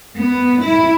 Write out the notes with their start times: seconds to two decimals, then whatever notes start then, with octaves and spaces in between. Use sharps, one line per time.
0.19 B3
0.64 E4